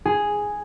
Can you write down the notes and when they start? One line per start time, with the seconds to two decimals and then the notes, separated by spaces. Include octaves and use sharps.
0.05 G#4